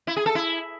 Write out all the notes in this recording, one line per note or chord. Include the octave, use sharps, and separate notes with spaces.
E4
G#4
A4
E4